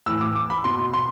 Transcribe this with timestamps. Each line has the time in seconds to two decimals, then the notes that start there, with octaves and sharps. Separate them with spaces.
0.06 A2 E3 E6
0.21 D6
0.36 D6
0.50 B5
0.64 B2 C6
0.94 C6